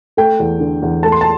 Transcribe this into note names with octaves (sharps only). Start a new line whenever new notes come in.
A3 G5
E2
D3
E2
A3 A5
C6
A5